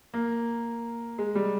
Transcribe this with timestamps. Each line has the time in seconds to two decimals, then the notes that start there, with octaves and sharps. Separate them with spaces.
0.14 A#3
1.18 G#3
1.35 G3